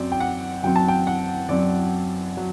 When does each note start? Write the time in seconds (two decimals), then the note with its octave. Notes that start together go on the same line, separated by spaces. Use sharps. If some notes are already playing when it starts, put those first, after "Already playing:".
Already playing: F#2 F#3 C4 D5
0.12 G5
0.20 F#5
0.63 F#2 F#3 C4 G5
0.76 A5
0.88 G5
1.07 F#5
1.49 F#2 F#3 C4 D5
2.37 F#3